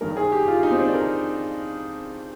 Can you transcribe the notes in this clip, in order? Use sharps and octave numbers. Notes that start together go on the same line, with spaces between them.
G2 D#3 A#4
G#4
G4
F4
D#4
C4
D4
A#4